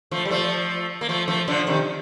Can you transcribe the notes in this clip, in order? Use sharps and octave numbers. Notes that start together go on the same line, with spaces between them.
F3 A3
G3
F3 A3
A#3
F3 A3
F3 A3
D3 F3
C3 D#3